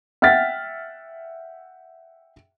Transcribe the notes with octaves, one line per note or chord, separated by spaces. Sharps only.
E5 F#5 G5 F6 A6 B6